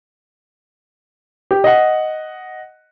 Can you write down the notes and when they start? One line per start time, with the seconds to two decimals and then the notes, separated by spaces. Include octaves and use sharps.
1.51 G4
1.64 D#5 F#5